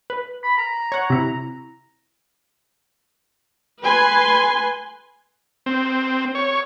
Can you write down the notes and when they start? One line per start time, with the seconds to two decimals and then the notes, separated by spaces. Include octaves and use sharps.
0.10 B4
0.44 B5
0.58 A#5
0.92 C#5 F#5
1.10 C3 E4
3.82 B4 G#5 C6
5.66 C4
6.35 C#5